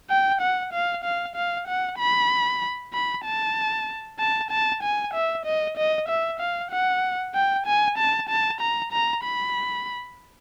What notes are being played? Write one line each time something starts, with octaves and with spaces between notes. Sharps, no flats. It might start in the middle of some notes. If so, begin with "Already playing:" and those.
G5
F#5
F5
F5
F5
F#5
B5
B5
A5
A5
A5
G#5
E5
D#5
D#5
E5
F5
F#5
G5
G#5
A5
A5
A#5
A#5
B5